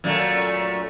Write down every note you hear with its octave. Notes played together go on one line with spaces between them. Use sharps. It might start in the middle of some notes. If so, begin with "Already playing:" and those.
F#2 A#2 A3